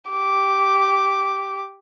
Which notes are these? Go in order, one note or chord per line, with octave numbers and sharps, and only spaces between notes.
G4 D6